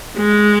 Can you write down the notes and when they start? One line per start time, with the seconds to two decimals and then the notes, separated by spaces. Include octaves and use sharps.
0.17 G#3